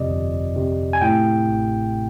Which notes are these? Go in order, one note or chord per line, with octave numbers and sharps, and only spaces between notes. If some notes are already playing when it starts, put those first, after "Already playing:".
Already playing: F2 C3 D5 D#5
G1
C3
G#5
A2 G5
A1